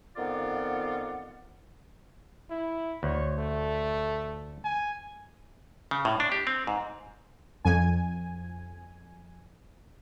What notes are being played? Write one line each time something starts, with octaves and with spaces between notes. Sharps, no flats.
F2 D#3 B3 F4 D5 F#5
E4
D2 C#5
A3
G#5
C#3
A2
D4
G4
C4
G#2
F2 G#5